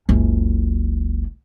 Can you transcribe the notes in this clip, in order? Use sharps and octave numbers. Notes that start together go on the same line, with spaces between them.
F#1 C#2